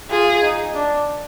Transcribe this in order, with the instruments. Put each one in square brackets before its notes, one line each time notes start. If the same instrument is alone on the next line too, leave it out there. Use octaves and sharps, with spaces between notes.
[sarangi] F4 [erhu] G#4
[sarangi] D#4
D4